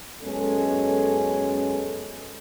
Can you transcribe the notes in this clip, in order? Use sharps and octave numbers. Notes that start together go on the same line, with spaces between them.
F#2 G#3 B3 C#4 A4